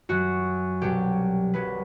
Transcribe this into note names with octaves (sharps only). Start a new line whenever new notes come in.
F#2 F#3 F#4
C2 B2 F#3 G4
C2 C3 F#3 B4